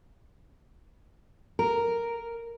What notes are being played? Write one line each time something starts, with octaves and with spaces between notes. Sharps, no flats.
A#4